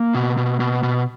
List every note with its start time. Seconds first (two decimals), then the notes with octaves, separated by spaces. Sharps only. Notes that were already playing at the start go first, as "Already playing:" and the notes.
Already playing: A#3
0.15 B2
0.37 B2
0.60 B2
0.83 B2